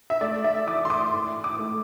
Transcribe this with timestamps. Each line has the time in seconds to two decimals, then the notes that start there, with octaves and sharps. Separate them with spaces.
0.10 E5
0.21 A3 D5
0.44 E5
0.67 E3 D6
0.85 C6
0.90 D6
1.14 A2
1.44 D6
1.59 A3